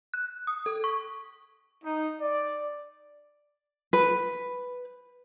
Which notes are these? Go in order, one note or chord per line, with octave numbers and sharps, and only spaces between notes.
F#6
D#6
A4
C#6
D#4
D5
B4